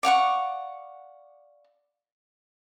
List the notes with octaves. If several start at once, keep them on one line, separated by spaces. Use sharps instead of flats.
D5 F5 F#5 C#6